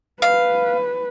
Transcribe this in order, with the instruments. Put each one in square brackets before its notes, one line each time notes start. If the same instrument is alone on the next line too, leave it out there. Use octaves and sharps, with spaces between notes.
[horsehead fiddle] B4 [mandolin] F5